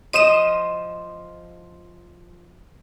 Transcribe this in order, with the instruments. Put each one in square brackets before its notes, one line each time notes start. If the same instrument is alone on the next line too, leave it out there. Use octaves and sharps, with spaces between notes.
[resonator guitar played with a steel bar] F3 D#5 [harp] C5 [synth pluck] D#7 E7